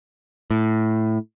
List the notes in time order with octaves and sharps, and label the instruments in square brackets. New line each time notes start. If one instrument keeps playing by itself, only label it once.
[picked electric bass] A2